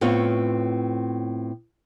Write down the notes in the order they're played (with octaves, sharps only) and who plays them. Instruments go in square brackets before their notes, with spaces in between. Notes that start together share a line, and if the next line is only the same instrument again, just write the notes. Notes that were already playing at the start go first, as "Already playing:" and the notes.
[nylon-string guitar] A2 B3 C4 F4 C#5